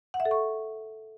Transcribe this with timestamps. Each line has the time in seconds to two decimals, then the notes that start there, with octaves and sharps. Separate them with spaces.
0.14 F#5
0.20 E5
0.25 A4
0.31 C#6